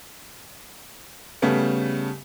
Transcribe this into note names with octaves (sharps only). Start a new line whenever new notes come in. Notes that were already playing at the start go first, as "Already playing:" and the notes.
C#3 G3 A3 B3